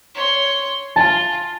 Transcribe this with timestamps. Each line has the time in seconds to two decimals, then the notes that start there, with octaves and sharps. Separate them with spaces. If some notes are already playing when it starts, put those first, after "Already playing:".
0.15 C#5 C6
0.96 F4 A5